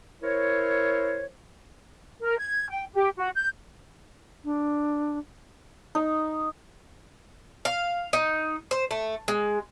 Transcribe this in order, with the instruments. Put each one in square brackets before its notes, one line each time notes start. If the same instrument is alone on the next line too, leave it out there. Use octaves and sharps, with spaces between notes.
[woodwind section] E4 A#4 C5 C#5
[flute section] A#4
G#6
G5
G4
F#4
G6
[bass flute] D4
[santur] D#4
[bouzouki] F5
D#4
C5
A3
G#3